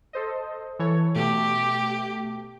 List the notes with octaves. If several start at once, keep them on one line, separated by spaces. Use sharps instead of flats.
A4 C5 D#5
E3 A4 C#5
B2 A3 G4